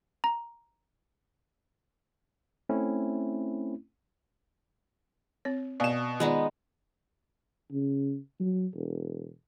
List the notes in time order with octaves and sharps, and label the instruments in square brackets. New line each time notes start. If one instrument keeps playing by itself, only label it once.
[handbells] A#5
[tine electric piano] A3 C4 C#4 E4
[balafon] C4 C#5
[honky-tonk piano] B2 E7 [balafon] D5 F5 G#5
[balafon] D#3 F4 D5 [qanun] G#3 B3 D#4
[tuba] C#3
F#3
E1